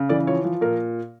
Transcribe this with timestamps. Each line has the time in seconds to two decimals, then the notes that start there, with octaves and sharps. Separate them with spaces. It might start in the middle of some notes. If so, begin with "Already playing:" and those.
Already playing: C#3
0.09 E3 D5
0.27 F3 C#5
0.44 F3
0.61 A#2 A#4